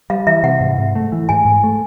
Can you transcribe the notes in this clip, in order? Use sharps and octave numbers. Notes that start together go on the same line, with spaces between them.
G3 F5
E3 E5
C3 F#5
G#2
G#2
A3
E3
G#2 G#5
G#2
A3